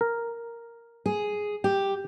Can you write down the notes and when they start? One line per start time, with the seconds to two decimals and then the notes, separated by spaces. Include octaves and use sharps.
0.01 A#4
1.06 G#4
1.64 G4